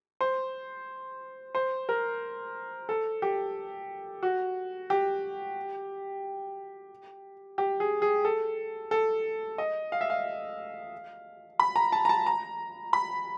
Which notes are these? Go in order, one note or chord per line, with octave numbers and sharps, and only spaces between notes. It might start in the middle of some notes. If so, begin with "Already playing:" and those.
C5
C5
A#4
A4
G4
F#4
G4
G4
G#4
G#4
A4
A4
D#5
F5
E5
F5
B5
A#5
A5
A#5
A5
A#5
B5